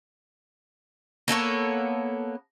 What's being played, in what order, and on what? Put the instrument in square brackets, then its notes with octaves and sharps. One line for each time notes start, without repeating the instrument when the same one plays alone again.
[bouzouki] A#3 B3 A4 C#5